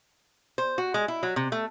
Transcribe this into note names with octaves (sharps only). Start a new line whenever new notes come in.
C5
F#4
G#3
E4
F#3
C3
A3